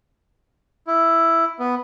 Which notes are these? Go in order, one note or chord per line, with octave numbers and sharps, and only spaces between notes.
E4
B3